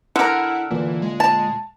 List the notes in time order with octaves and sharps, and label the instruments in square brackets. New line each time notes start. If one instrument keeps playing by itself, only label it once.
[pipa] D3 A#4 [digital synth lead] E4 [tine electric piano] F#5 E6 F6
[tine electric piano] D2 A#2 [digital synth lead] E3
[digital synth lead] G#3
[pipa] A5